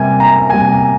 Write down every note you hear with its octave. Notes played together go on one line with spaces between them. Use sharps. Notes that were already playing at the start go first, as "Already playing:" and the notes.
Already playing: C3 G3 A#3 G#5
A#5
C3 G3 A#3 G#5